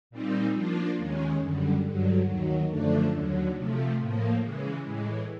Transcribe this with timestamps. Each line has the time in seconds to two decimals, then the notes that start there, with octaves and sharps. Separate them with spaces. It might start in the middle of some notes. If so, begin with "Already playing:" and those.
0.11 A#2 G3 C4 D#4
0.54 F3 A#3 D4 F4
0.97 D#2 D#3 G#3 C#4
1.40 F#2 D3 G3
1.83 G2 D3 F#3
2.26 D#2 D#3 F#3
2.69 F#2 D3 F3 A3 D4
3.13 D#2 D3 F#3
3.55 C3 F3 A3
3.99 A2 F3 A#3
4.42 C#3 E3 G#3
4.85 A2 E3 G#3